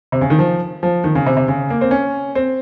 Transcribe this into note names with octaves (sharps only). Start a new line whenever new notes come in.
C3
C#3
D#3
F3
F3
D#3
C#3
C3
C3
C#3
A#3
C4
C#4
C4